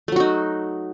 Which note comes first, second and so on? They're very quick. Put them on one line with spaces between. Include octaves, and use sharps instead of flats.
A3 F#3 F#4 D#4